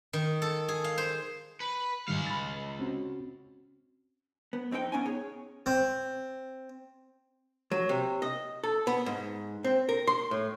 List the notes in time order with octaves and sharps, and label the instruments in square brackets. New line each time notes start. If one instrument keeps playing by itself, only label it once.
[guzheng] D#3
A4
G#4
F5
C5
[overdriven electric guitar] B4
[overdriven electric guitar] C#2 F5 [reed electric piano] G#2 D#3 G3
[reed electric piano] B5 A6
C4 C#4 F#4
[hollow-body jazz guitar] B3
F2 C4 D#4 G4 G5
B3 C#4 D#4 F#5 G#5
G#4 C#5
[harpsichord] C4
[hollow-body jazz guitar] F#3
C3
D#5
A4
B3
G#2
C4
A#4
C6
A2